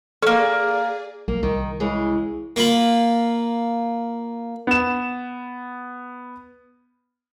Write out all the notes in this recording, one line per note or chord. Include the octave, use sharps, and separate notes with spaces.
A#3 C#4 G#4 A4 D5
B1 A#3
C2 D#3
C#3 E3 G#3
A#3 F4 B5
B3 E7